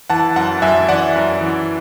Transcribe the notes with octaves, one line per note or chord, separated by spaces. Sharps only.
E3 F#5 A5
F#2 F#5 A5
F#2 E5 G#5
E3 D5 F#5
F#2
E3